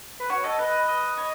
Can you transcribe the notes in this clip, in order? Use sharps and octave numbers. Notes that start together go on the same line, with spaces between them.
B4
F#4 C#5
A4 D#5
B4 D#5
D#5
C#5